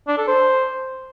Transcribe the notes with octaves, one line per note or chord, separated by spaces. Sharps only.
D4
A4
C5